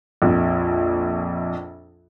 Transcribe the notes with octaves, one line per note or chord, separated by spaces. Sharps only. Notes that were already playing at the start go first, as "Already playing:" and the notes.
A#1 F2